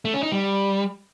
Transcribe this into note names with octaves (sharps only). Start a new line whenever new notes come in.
A3
C#4
D#4
G3